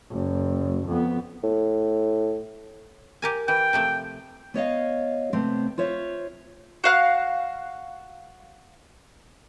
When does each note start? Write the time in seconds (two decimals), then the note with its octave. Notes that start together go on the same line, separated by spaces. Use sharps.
0.11 F#1
0.88 F2 B3
1.43 A2
3.22 G4 A#4 G#5
3.48 E3 G5
3.73 C3 F3 A3
4.54 B3 C#5 D#5 F5
5.33 C3 A3 B3 C4
5.78 F4 C5 C#5 E5
6.84 F#4 F5 F#6